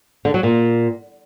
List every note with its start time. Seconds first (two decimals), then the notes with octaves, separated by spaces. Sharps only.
0.25 D3
0.34 F#3
0.43 A#2